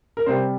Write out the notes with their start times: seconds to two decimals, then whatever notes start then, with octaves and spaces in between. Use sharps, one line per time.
0.17 A#4
0.26 C3 G3 C5